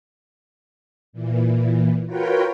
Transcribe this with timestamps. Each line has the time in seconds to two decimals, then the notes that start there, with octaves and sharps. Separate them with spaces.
1.13 A#2 E3
2.06 F4 F#4 A#4 B4 C#5 G5